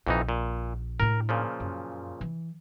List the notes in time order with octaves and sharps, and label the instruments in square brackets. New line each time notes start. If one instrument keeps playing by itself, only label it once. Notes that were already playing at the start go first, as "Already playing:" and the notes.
[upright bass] A#1 [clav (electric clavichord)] F2 E3 D#4
[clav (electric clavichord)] A#2
[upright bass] A2 D4 [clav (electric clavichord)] A#4
[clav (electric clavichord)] A#2 C#3 F3
[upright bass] F#2
E3